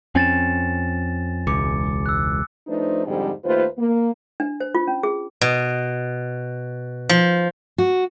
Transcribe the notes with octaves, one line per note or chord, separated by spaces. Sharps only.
F2 C4 C#4 G#5 A6 E7
E1 C#2 D6 C#7
E6 F#6
F3 A3 D4 D#4 B4 C5
F2 G#2 D3 G3 G4
D#2 A3 F4 B4 C5
A#3
D4
C5
F4
C#4
G#4
B2
F3
F#4